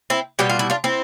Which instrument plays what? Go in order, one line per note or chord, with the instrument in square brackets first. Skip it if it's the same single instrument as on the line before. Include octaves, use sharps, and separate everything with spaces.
[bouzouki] C4 E4
B2 G3 G4
F4
E4
D4 F4
C4 E4